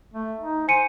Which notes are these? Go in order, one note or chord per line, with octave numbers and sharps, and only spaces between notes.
A3
D#4
C5 G#5 C#7 D#7